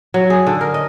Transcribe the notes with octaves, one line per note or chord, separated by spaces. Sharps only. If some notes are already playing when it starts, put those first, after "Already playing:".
F#3
G#4
D3
A#4
D#5